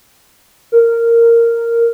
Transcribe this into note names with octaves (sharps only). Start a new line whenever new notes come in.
A#4